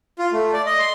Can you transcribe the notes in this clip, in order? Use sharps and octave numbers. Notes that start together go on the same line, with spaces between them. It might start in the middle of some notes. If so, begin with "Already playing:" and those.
F4
A3
D5
D#5
C6